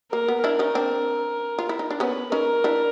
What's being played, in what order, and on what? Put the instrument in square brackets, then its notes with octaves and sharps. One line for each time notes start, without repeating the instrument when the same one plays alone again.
[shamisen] A#3 [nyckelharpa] A#4
[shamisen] B3
[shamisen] D4 E4 [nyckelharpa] A#4
[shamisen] C#4 D#4
C4 D4
F4
E4
D#4
D4
[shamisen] B3 C#4 [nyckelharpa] B4
[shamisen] C#4 D#4 [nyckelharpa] A#4
[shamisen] D4 E4